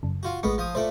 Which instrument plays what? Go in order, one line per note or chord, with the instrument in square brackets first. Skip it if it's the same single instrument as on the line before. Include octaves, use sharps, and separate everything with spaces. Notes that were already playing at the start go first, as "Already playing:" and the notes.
[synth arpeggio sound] F#2 C#3
[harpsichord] F4 F#4
[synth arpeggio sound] A1 A3 C#6 [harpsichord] G#3 B3
[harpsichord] F3 D#6
[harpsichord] A#2 A3 D5 [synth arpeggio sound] C5